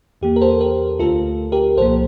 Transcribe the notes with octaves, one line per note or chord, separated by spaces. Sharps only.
E2 E3 A#3 G4
A#4
A4 C5
G4 A#4
D2 D3 A3 F4 A4
G4 A#4
C2 A#2 F3 A#3 A4 C5